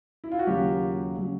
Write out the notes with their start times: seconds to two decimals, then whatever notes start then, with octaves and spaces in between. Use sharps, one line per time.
0.24 E4
0.32 F4
0.39 F#4
0.47 D#2 C#3 F#3 F4 G4
1.17 C#3 F#3